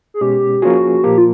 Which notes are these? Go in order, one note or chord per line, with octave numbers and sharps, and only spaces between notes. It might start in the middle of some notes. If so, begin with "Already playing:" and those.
G#4
B2 G#3 C#4 G4
F3 A#3 C#4 F4 F#4 G#4
A#2 F3 A#3 G4
F4